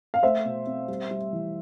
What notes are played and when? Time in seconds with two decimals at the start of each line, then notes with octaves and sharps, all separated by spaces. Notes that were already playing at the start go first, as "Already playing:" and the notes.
0.14 F5
0.23 A3 C5 E5
0.45 B2
0.67 C4
0.88 G3
1.11 G3
1.33 E3